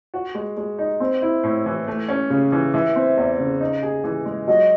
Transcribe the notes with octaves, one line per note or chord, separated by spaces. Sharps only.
F#4
G#3
G#3
D#4
C4
E4
A2
E3
A3
C#4
C#3
E3
E3 E5
C4
E2
C#3
D#4
G#4
E3
G#3
F#3 D#5